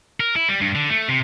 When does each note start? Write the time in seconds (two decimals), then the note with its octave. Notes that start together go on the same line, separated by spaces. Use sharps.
0.20 A#4
0.36 E4
0.49 G3
0.61 G2
0.75 D3
0.90 A3
1.09 C3